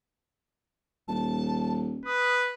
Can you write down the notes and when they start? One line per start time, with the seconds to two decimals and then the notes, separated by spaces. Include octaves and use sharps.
1.08 D#1 A5
2.06 B4 D#6